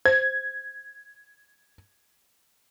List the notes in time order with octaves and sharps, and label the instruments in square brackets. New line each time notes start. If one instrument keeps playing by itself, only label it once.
[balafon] C5 [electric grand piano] G#6